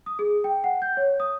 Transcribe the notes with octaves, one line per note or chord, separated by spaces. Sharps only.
D#6
G#4
G5
F#5
G6
C#5
D#6